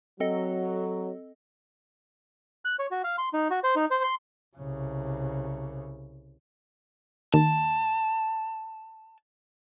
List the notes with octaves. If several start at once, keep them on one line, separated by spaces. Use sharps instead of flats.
F#3 C4 A4 D#5
F#6
C#5
F#4
F5
C6
D#4
F#4
C5
D#4
C5
C6
C2 C#3
D#2 A5